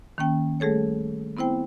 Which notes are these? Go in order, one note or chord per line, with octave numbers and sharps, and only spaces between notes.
D#3 A#3 C#4 G5
G3 A3 G#4 A4 C#5
B3 C4 E4 C5 G5